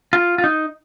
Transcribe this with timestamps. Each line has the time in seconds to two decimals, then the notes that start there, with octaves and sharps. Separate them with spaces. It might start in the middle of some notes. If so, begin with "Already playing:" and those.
0.13 F4
0.38 F4
0.44 D#4